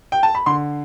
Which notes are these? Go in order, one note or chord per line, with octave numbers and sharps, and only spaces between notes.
G5
A5
B5
D3 C6